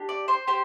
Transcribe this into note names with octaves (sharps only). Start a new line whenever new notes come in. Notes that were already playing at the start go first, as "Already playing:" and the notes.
Already playing: D4 G4
D5
C5
G4 C5